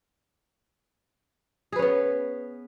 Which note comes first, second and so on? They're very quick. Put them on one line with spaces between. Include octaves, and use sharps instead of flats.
G#4 B4 C#4 B3